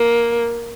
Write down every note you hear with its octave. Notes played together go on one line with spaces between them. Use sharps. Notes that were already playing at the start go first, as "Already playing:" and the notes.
Already playing: A#3